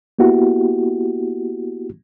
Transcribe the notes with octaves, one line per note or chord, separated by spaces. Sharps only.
A#3 B3 E4 F#4 G4